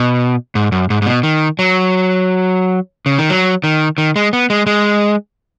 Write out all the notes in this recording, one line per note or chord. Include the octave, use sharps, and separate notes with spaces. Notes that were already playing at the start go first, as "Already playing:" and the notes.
Already playing: B2
G#2
F#2
G#2
G#2
B2
D#3
F#3
C#3
D#3
F#3
D#3
D#3
G#3
B3
G#3
G#3